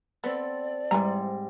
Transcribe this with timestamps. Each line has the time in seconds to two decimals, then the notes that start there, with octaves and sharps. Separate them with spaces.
0.24 B3 C4 A4 D5
0.91 G#2 E3 G3 G#5 A#5